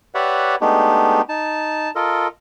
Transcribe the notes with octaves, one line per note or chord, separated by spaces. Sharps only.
G4 B4 C#5 D5 E5 F#5
G#3 A3 B3 D4 D#4 G4
D#4 A5
F4 A4 A#4 D#5